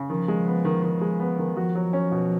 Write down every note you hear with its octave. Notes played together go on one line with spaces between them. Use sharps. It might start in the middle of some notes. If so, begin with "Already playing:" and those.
Already playing: C#3
D#3 F3
G#3
B3
D#3
D#3
G#3
B3
D#3
F3 F#4
F#3
C#4
B2